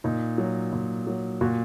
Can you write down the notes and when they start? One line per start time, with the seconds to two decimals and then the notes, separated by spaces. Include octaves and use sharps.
0.04 A#2 D#4
0.38 F#3
0.73 A#2
1.07 F#3
1.41 A#2 F#4